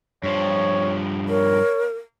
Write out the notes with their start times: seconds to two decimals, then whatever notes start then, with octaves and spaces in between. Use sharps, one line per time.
0.23 G2 F3 C#5
1.29 A#4 C#5